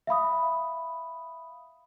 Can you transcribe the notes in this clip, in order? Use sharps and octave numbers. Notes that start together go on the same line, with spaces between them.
E5 F5 B5 D#6